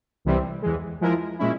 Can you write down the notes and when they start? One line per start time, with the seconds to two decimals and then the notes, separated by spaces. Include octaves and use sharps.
0.25 C2 C3 E3 G3 C4
0.62 E2 E3 G#3
1.01 F3 G#3 E4 A#4
1.39 A#2 G#3 C#4 E4